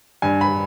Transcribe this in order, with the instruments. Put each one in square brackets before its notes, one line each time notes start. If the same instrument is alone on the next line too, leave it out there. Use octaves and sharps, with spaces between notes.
[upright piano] G2 G#5
B5